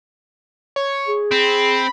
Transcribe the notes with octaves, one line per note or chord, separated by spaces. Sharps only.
C#5
G#4
C4 B5